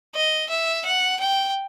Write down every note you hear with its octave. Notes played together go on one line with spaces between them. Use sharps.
D#5
E5
F#5
G5